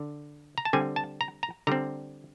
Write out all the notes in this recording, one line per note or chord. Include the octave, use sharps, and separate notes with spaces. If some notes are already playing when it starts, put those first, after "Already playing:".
Already playing: D3
A#5
A5
D3 G3 C4 G#5
A5
A#5
A#5
D3 G3 C4 A#5